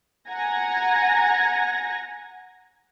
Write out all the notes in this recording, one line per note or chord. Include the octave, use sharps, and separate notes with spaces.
F#5 G#5 A#5 G#6 A#6